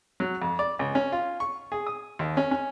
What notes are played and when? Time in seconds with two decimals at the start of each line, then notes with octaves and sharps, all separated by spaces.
0.20 F#3
0.42 F2
0.59 D5
0.79 C#2
0.95 C#4
1.12 F4
1.40 C#6
1.72 G#4
1.87 D#6
2.19 D#2
2.37 C#4
2.51 C#4